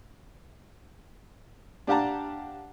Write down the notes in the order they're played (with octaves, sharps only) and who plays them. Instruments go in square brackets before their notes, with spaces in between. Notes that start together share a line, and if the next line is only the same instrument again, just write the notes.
[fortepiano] D4 G4 F5 F#5 A5 A#5